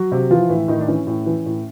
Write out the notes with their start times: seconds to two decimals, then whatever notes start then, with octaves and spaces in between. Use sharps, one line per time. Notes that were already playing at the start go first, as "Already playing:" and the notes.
Already playing: F#3 F#4
0.12 C3
0.30 E3 F3 F4
0.49 A2 E3 E4
0.68 A2 D#3 D#4
0.81 D4
0.87 E3 C#4
1.07 A2
1.26 E3
1.46 A2